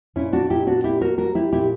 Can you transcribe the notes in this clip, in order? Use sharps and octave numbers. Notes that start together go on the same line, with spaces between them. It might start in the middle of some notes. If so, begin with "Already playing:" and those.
A#2 C#4 E4
D4 F#4
A#2 E4 G4
D4 F#4
A#3 E4 G4
F#4 A#4
G3 F#4 A#4
E4 G4
A#2 E4 G4